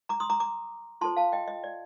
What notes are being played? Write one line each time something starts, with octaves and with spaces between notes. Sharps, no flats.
A#5 D6
C6 D#6
A#5 D6
A#5 D6
F4 A4 C5 A5 C6
F5 A5
D#5 G5
D#5
D5